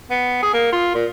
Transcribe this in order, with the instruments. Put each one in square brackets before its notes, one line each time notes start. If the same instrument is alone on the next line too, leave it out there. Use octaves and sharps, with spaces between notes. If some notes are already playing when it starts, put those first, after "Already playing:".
[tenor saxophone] B3
G#4
A#3
F4
A#2